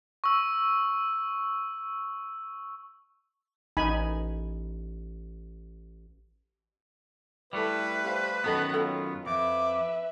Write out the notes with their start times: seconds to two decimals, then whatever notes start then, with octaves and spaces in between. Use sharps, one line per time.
0.24 C#6 E6
3.77 A1 D#4 G#5 B5
7.53 G3 A3 E4 A4 B4
8.04 G4 C5 F5
8.44 F#2 D#3 B3 F#4 A4 D#5 F#5
8.74 F4 A4 C#5 G5
9.27 F2 B4 E5 D6